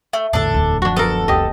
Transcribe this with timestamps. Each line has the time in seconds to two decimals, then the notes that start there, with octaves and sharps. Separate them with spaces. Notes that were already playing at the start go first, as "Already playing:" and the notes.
0.13 A3
0.33 A#1 E2 A2 D3 D4 A4
0.54 D1 D2
0.82 F#2 F3 D4 F#4
0.97 B3 A4 A#4
1.28 C2 F2 G4 D#5